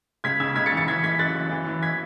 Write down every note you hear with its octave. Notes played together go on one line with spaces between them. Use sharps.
C#2 G#6 B6
C#3 E6 G#6
C#2 G#6 B6
A6 C#7
E3
A6 C#7
E3 G#6 B6
E3 G#6 B6
F#2 F#6 A6
F#2
E3
E3
G#6 B6